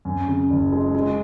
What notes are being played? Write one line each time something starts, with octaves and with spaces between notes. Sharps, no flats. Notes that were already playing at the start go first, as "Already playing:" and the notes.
F#2
C#3
F#1
G#3
G#3